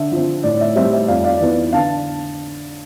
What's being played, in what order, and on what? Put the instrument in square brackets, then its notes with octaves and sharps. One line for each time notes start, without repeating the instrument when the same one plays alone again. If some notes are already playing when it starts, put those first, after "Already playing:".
Already playing: [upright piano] D3 E5
F3 C4
A2 D5
E5
G3 C4 E5
E5
F2 D5 F5
D5 F5
E3 B3
D3 F5 A5